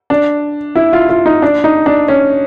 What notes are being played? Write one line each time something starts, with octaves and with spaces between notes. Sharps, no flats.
D4
E4
F4
F4
D#4
D4
D#4
D4
C#4